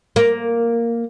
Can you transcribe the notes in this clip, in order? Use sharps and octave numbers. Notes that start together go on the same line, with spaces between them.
A#3